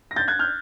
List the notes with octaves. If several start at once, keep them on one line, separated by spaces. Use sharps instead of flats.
A#6
G6 A6
F#6 G#6
F6 G6